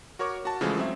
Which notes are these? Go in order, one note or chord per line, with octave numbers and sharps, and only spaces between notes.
F#4 A#4 C#5 C#6 D6
F#4 A5
C#3 E3 F3 G#3 A3
F#3 C4 E5